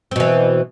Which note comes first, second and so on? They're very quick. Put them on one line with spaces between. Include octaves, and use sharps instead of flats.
C4 B2 E3